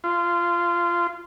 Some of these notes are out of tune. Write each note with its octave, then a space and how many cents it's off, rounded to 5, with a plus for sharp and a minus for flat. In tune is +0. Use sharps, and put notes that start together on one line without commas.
F4 -20